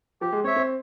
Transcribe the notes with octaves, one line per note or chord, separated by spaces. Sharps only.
F3 G4
G#3
C4 C#5 E5
C4